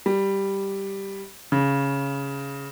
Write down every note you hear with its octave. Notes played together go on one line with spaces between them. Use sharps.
G3
C#3